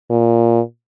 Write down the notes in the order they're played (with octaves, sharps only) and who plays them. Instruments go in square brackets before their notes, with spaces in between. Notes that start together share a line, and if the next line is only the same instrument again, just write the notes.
[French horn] A#2